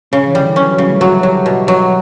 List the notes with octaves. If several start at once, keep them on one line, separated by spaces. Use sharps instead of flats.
C#3 C#4
E3
D3 G3
E3
F#3 C#4
F#3
C#3 G3
A3
F#3 F#4
F#3 G4
B2
F#3 F#4